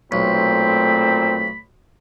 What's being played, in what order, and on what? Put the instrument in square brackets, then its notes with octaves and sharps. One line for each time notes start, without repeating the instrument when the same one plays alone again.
[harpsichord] B1 [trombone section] A#2 C4 [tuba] A3 [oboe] B5